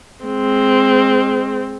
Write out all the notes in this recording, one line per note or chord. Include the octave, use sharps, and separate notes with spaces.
G#3 C4